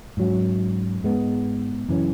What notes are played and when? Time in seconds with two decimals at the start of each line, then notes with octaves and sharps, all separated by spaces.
0.17 G#2 F#3 C#4
1.03 G#2 G#3 B3
1.89 F#2 C#3 E3 C#4